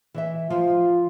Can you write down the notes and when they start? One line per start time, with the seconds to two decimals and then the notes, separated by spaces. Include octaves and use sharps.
0.14 E3 D#5 E5
0.50 F3 F4